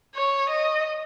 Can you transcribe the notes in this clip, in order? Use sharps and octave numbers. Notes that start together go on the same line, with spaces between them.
C#5
D#5